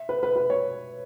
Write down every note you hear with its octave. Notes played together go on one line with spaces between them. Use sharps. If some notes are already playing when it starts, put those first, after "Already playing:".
Already playing: E5
B4
B4
B4
C#5